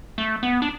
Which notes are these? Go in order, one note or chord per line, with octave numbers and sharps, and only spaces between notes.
A3
B3
D4